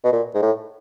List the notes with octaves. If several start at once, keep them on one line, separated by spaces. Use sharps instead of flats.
B2
A#2
G#2
A2